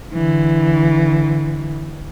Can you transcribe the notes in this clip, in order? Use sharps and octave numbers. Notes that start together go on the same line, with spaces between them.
D3 E3